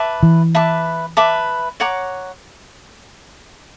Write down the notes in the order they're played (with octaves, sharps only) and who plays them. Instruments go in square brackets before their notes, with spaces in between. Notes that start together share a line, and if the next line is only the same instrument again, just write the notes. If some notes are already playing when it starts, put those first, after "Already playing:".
Already playing: [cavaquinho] B4 E5 A5 D6
[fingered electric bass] E3
[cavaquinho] B4 E5 A5 D6
B4 E5 A5 D6
C#5 F#5 A#5 D6